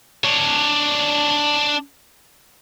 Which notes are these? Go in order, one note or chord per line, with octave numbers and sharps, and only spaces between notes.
D4 C#5